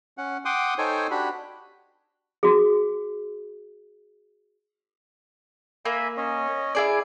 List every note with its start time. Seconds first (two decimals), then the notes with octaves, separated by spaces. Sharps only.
0.18 C#4 F#5
0.45 F#5 G5 C6 D6 D#6
0.78 D#4 A4 C5 C#5 G5 G#5
1.11 D4 F#4 G4 B5
2.43 F#4 G#4
5.85 A#3 E5 G#5 B5
6.17 C#4 C#5 D#5
6.75 E4 G#4 D5